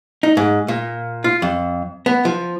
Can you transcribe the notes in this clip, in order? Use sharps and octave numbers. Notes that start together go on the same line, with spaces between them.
D#4
G#2
A#2
F4
F2
B3
F3